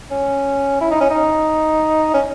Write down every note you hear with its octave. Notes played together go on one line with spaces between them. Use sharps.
C#4
E4
D#4
C#4
D#4
C#4